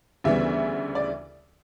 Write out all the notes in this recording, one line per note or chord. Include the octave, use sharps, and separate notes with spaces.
D2 C#3 E3 G3 B3 E5
D5